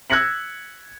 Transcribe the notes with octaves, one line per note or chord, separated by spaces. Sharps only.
E6 F#6 G#6 A#6 C#7 F#7